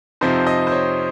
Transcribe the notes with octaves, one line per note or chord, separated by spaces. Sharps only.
F2 C3 F3 C4 D#4 C5
D#5
C5
C#5